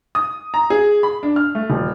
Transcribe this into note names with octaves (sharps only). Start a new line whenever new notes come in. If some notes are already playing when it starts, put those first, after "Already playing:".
D#6
A#5
G#4
B5
D4
F6
A3
D#1